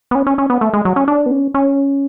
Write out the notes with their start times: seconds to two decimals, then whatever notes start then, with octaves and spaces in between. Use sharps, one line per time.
0.11 B3
0.15 C#4
0.27 C#4
0.38 C#4
0.50 B3
0.61 A3
0.74 G#3
0.85 F#3
0.96 C#4
1.08 D4
1.26 B3
1.31 C#4
1.54 C#4